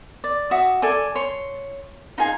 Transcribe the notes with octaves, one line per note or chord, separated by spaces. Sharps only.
D5
F#4 E5 D#6
A4 D5 G#5
C#5 C6
D#4 F4 G#4 G#5